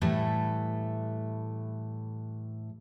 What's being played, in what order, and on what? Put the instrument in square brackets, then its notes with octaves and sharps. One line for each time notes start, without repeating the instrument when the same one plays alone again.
[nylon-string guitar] A2 E3 G3 A3